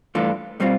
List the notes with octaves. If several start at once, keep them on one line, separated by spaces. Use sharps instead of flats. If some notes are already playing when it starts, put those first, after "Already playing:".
G2 E3 A3 D4 F4
B2 G3 C4 F4